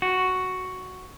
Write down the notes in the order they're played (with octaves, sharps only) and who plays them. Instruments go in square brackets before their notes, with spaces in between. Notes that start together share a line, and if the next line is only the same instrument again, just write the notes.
[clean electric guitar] F#4